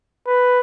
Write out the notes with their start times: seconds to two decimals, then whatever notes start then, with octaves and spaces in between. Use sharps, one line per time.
0.27 B4